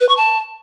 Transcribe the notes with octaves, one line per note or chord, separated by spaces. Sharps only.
B4
C#6
A5